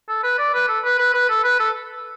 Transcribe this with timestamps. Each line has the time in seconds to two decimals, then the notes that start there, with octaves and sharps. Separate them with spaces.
0.08 A4
0.23 B4
0.38 D5
0.54 B4
0.69 A4
0.84 B4
0.98 B4
1.14 B4
1.29 A4
1.44 B4
1.60 A4